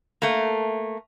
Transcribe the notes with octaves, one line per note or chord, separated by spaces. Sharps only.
A3 A#3